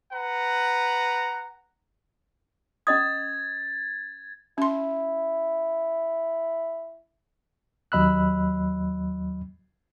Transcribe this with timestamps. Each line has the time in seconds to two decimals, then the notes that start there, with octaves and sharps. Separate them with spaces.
0.12 B4 F#5 A#5
2.87 C#4 D#5 D#6 G#6 A6
4.58 C#4 E4 C6
7.92 D#2 F#3 D#5 B5 E6 F#6